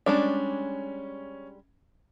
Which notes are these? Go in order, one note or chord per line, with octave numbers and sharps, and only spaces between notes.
G3 G#3 C#4 D4